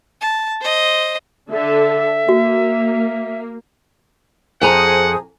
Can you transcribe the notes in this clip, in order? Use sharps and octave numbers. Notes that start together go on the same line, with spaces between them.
A5
C5 D#5
D3 A4 E5
A#3 F#4
F2 G#4 C5 F#5 G#5 A#5 D#6